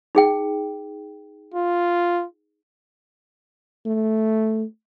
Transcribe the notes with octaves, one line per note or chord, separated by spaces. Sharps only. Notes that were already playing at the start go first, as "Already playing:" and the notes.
D#4 G#4 G5
F4
A3